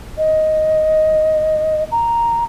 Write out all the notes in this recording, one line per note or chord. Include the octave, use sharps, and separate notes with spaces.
D#5
A#5